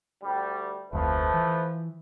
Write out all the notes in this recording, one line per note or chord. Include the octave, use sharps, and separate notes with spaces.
D2 G3
F1 D2 F3 A3 B4
E3